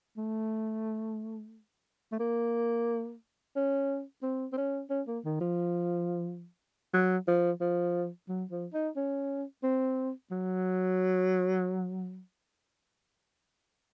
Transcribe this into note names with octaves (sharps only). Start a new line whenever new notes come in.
A3
A3
A#3
C#4
C4
C4
C#4
C#4
A#3
D#3
F3
F#3
F3
F3
F#3
F3
D#4
C#4
C4
F#3